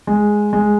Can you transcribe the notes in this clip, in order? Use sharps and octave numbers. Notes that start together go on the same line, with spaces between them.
G#3
G#3